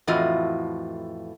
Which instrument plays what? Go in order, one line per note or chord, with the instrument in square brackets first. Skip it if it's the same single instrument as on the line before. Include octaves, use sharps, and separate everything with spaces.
[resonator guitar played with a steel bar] F2 A2 E3 F4 F#4 D#5